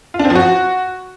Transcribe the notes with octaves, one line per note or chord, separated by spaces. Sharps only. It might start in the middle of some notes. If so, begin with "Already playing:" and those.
F4
D4
C4
F3
F#4